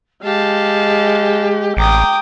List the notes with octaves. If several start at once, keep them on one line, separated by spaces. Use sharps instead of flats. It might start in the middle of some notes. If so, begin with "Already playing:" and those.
G#3 G4 F5 A5
A1 G5 A#5 D6 D#6